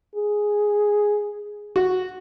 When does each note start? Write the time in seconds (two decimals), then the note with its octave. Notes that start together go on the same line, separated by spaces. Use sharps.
0.15 G#4
1.76 F#4